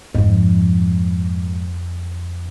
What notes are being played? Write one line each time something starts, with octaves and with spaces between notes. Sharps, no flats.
F2 G#2 F3